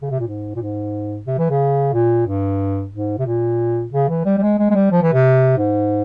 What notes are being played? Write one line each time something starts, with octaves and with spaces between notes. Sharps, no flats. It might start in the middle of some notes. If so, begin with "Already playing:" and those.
C#3
C3
A#2
G#2
A#2
G#2
C3
E3
C#3
A#2
G2
G#2
C3
A#2
C#3
E3
G3
G3
G#3
G#3
G#3
G3
F3
E3
C3
G#2